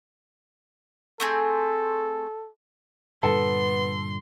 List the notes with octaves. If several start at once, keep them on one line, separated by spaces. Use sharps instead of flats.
A3 C4 G#4 A4
G2 A#2 D3 B3 A4 C6